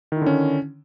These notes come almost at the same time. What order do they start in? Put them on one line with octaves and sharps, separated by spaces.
D#3 E4 D3 C#4